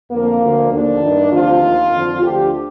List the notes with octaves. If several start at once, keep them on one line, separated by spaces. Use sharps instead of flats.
F2 D3 F3 A#3
D2 D3 F3
D#2 D3 F3 D4
G2 D#3
D2 C3 F3 F4
D#2 D#3
F2 D3 F3
D2 D3 F3 G4